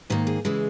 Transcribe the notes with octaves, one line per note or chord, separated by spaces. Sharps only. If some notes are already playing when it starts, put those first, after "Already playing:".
G#2 D#3 A#3 A#4
G#4
C#3 E3 G#3 E4